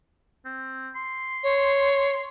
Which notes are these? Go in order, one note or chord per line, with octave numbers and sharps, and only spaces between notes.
C4
C6
C#5